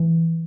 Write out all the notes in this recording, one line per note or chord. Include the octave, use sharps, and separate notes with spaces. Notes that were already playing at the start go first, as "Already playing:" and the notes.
Already playing: E3